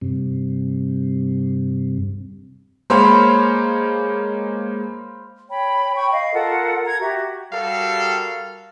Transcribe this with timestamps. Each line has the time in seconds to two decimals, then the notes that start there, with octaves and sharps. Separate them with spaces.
0.02 G2 C3
2.90 G#3 A#3 C5 C#5 F5 B5
5.50 C#5 G5 B5
5.96 G5 B5 C#6
6.11 D#5 F5
6.34 F4 A4 A#4 F#5
6.85 A#5 G#6
7.00 F#4 G4 E5
7.52 G3 F#4 G4 A4 A#4 F5